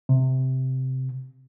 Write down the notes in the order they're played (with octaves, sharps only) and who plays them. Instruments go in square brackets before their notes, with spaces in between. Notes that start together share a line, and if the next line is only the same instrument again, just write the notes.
[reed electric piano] C3